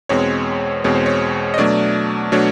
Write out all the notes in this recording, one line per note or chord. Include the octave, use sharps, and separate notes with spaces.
E2 B2 G#3 C4 C#5
E2 B2 G#3 C4 C#5
C5
C#5
D#5
B2 F#3 A3 D4 D5
B2 F#3 A3 D4 C#5